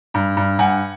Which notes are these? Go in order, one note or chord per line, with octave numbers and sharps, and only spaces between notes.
G2
G2
G2 F#5 G#5